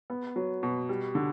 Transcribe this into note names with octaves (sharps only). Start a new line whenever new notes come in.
B3
F#3
B2
G3
D3